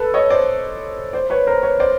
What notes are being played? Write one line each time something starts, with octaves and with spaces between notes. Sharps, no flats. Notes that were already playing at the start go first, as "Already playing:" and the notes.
Already playing: A4 B4
C#5 D#5
C5 D5
C5 D5
B4 C#5
A#4 C5
B4 C#5
C5 D5